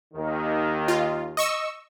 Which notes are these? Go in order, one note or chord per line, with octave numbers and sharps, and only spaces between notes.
D#2 D#3
F4
D#5 C#6 E6